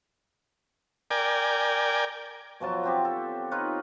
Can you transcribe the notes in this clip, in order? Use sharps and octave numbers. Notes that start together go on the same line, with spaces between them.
A#4 D5 G5 G#5
B2 F3 F#3 A5
B3 C4 G4
A4
D#4 F4 B4 C#5